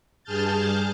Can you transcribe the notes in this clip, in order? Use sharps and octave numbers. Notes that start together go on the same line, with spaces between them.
G2 G#4 A5 F6 G6 A6